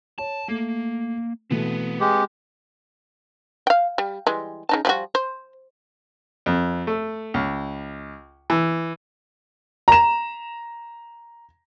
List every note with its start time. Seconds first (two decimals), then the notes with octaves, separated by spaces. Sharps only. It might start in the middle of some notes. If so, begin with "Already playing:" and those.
0.18 C#5 A5
0.48 A3 A#3
1.51 B2 E3 A3 C4 B4
2.00 G#3 G4
3.67 F5 G5
3.98 G3
4.27 E3 G3 G#3
4.69 C#3 D#4 A5
4.85 F3 G3 F#4
5.15 C5
6.46 F2
6.87 A3
7.34 C#2
8.50 E3
9.88 A#5 E7